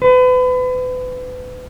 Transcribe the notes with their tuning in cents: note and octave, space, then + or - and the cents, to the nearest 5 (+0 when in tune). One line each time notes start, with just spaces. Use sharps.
B4 +35